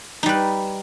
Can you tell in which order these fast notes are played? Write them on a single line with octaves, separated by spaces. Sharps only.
D#4 G3 B4